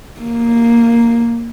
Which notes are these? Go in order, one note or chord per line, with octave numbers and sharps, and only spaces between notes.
A#3